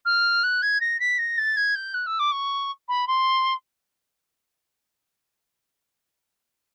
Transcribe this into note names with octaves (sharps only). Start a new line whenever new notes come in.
F6
F#6
G#6
A#6
B6
A#6
A6
G#6
G6
F#6
E6
D6
C#6
B5
C6